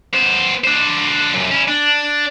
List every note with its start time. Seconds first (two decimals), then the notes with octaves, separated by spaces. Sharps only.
0.14 B3 C5
0.64 D4 C5
1.34 F#2 C3
1.51 C#4 E4
1.68 D4